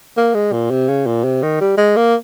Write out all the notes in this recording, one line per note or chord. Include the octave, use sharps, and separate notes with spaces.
A#3
G#3
A#2
C3
C#3
A#2
C3
D#3
G3
G#3
A#3